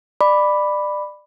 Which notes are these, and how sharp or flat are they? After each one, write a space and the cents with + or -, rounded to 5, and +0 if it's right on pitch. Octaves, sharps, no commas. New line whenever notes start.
D5 +25 B5 +0 D6 +0